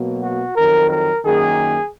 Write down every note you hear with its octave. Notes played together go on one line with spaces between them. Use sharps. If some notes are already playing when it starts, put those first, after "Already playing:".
Already playing: B2 F#3 A#3
F#4
F2 D#3 F#3 A#4
A#4
F#2 D#3 A#3 G#4